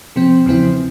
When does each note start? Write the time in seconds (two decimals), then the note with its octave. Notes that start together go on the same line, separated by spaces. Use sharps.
0.16 C3 F3 C4
0.46 E2 C#3 F3 C4 E4